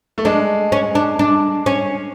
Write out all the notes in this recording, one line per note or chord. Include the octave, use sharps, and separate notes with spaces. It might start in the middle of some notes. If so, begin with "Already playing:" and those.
A3
G#3 D4
C#4
D4
D4
C#4